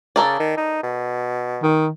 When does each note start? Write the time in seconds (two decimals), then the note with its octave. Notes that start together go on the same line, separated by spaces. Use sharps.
0.16 C#3 A4 A#4 D5
0.40 D#3
0.57 D#4
0.83 B2
1.63 D#3